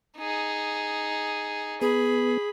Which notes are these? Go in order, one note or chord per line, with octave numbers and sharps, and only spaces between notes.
D#4 G#4
B3 G#4 B5